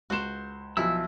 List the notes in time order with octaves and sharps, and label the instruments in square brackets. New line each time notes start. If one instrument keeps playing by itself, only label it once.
[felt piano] C#2 C6 E7 [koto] F#4 C5
[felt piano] B1 F3 [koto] E4 [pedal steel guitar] E6